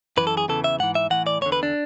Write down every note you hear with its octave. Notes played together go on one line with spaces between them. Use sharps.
F#2 E3 B4
A4
G#4
E2 C#3 E3 A4
E5
G#2 E3 F#5
E5
A2 E3 F#5
D5
E2 D3 C#5
B4
D4